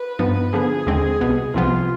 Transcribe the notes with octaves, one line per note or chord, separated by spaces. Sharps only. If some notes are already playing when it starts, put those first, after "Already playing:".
Already playing: B4
G2 F3 B3 D#4
D3 F3 B3 G#4
D#2 D3 G#3 C4
C2 B2 B3
C2 C3 F3 B3 F4